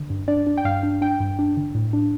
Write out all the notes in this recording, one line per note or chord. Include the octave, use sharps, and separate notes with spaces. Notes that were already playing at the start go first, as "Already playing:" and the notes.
Already playing: D3
G2
D4 D5
D4
G5
G2 F5
D4
D4 G5
G2
D4
D3
A2
D4